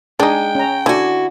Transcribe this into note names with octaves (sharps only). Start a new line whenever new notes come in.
G#3 D4 D#4 G#4 G5
C#4 A#5
D3 E4 F#4 D5 G#5